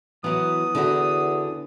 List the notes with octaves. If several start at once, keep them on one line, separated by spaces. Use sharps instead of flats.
E3 F#3 B3 D#6
E2 D3 E4 F#4